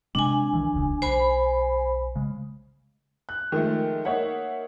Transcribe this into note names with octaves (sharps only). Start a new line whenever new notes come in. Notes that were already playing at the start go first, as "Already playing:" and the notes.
C3 G#3 C4 D4 G#5
C2 D#3 E3
D#1 C#2 C#3
B1 C5 G#5 B5
C#3 G#3
F#6
D#3 F3 G#3 A3
A#3 D#4 C#5 E5 F#5